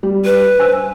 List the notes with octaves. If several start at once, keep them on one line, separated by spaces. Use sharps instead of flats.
G3
B4
C5 G#5 E6